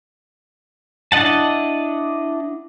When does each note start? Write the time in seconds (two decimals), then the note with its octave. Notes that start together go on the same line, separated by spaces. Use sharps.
1.12 D4 E4 D#5 F#5 A5